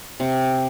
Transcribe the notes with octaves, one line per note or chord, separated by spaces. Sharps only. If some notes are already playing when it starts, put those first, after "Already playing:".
C3